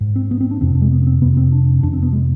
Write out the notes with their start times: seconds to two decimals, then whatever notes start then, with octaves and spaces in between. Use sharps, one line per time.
0.01 G#2
0.16 C4
0.31 B3
0.41 C4
0.51 D4
0.61 F2 C3 C4
0.82 G#3
0.92 B3
1.02 B3
1.07 C4
1.22 C3 B3
1.25 F2
1.37 C4
1.52 D4
1.83 F2 C3 D4
1.93 C4
2.03 B3
2.13 G#3